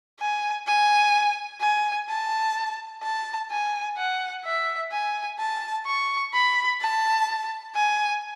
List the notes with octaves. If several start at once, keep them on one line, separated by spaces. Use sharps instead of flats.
G#5
G#5
G#5
A5
A5
G#5
F#5
E5
G#5
A5
C#6
B5
A5
G#5